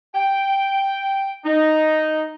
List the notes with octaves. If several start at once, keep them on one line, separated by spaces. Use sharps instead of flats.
G5
D#4